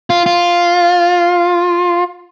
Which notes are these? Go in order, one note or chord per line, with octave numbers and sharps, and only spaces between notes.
F4
F4